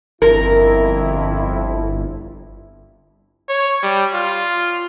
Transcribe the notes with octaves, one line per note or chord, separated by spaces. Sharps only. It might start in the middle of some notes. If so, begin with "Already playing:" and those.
G1 F2 E4 A#4
C#5
G3
F4